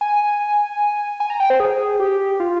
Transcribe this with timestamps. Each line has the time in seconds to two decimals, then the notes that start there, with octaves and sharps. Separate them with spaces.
0.01 G#5
1.20 G#5
1.30 A#5
1.40 G5
1.50 C5
1.60 G#4
2.00 G4
2.40 F4